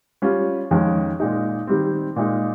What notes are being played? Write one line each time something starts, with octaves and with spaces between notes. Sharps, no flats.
G3 C#4 F4
F2 D#3 G#3 C#4
A#2 G#3 D#4
D#3 G3 C4
A#2 G#3 D#4